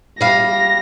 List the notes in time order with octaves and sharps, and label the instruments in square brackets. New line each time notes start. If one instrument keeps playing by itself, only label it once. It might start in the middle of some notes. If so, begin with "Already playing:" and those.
[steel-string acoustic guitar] G3 F5 [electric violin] A#6